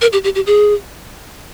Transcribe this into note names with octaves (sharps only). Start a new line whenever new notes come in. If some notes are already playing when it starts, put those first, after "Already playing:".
A#4
G4
G4
G4
G#4